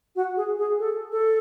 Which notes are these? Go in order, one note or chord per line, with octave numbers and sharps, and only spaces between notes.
F#4
G#4
G#4
A4
A4